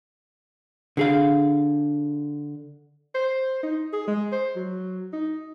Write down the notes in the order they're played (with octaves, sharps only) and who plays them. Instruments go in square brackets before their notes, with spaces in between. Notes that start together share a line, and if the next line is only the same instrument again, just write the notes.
[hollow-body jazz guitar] D3 G#4 F5
[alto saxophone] C5
D#4
G#4
G#3
C5
F#3
D#4